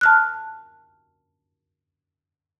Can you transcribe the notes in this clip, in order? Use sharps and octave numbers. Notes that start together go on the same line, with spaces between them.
A5 F6 F#6